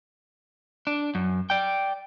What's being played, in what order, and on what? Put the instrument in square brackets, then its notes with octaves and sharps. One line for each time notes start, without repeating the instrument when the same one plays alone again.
[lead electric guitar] D4
F#2
D5 G5